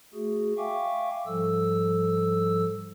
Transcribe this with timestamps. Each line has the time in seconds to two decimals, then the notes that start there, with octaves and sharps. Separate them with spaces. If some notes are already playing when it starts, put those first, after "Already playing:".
0.14 A3 F#4 G#4
0.57 E5 F5 G5 G#5 C#6 D6
1.26 G#2 F3 G3 A4 E6